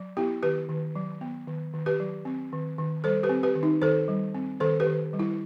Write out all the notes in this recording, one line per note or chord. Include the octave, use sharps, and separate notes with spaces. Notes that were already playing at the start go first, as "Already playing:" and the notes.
Already playing: F#3
B3 E4 G4
D#3 G4 B4
D#3
F#3
B3
D#3
D#3
G4 B4
F#3
C4
D#3
D#3
G3 A4 C5
G4 B4
C4
G4 B4
D#3
D#4
D#3 A4 C5
G3
C4
D#3 A4 C5
G4 B4
D#3
G3
E4